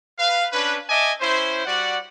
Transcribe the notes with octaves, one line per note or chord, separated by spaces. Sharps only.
B4 F5
C#4 D4 B4
D#5 E5 G#5 A5 D6
C#4 E4 C5
G3 F#4 D5 F#5